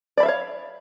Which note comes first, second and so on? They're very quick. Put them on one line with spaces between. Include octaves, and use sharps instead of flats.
D5 B5 E5 F5 C#5